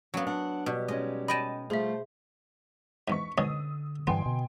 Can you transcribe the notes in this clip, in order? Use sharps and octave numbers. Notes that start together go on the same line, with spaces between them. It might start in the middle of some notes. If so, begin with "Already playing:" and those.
F#3 B3 C#4 D5 F5
D4 F#5
B2 G3
G#3 C#4 D#4 D#5
D#5 G5 A5 B5 A#6 D#7
G3 A3 F4 G#4 C5 E5
E2 G#2 C#6 B6
G#2 B2 D3 C#4 D#6 E6
G2 E3 B3 G5 G#5 C6
B2